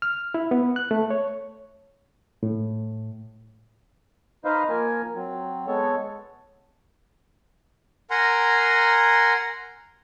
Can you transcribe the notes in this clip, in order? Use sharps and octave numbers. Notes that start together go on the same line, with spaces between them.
F6
E4
B3
F#6
A3
C#5
A2
D#4 B4 C5 D#5 F5
F3 A#3 A#4 G#5
F#3 C4
G#3 B3 A4 C#5
A#4 F#5 G#5 A#5 C6